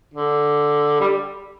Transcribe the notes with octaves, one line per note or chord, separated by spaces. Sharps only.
D3
G3